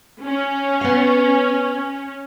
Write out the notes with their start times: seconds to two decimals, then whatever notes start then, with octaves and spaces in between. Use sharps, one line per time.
0.23 C#4
0.81 B3 F5